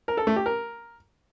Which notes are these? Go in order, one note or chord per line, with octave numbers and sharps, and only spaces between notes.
A#4
A4
A3
G4
A#4